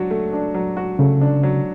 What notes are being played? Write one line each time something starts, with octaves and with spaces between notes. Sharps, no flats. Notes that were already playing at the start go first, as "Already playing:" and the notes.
Already playing: F#3 D4 F#4
A3
D4
F#3
F#4
C#3 A3
D4
F#3